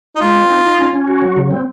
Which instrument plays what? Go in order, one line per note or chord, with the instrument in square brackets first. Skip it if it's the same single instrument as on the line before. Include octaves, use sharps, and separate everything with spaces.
[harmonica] D#4
[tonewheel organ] G#3 [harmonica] F4
[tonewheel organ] C4
D#4
D#4
C#4
C#4
F#4
F#3
C#3
C4